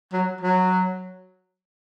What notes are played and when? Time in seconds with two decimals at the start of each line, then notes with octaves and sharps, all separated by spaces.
0.12 F#3
0.41 F#3